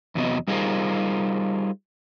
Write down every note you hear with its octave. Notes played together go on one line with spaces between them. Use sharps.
E2 A2 C3 F#3 B3 D#5
G3 D#4 F4 G#4 A#4 C5